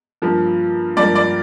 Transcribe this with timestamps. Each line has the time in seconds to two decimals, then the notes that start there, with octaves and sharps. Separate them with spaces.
0.22 G2 F3 A#3
0.97 G2 F3 A#3 D5
1.15 D5